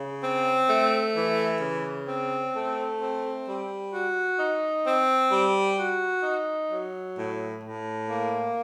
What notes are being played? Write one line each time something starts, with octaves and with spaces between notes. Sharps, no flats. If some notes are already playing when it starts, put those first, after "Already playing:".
Already playing: C#3
C4
A3
E3
C#3
C4
A3
C4
G3
F#4
D#4
C4
G3
F#4
D#4
F#3
A2
A2
A#3